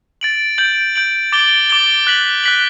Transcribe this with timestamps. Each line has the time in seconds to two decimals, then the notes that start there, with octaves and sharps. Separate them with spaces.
0.21 A6 D7 F#7
0.58 G6 D7 F#7
0.95 G6 D7 F#7
1.32 D6 A6 D7 G7
1.69 D6 A6 D7 G7
2.07 F#6 B6 F#7
2.44 F#6 B6 F#7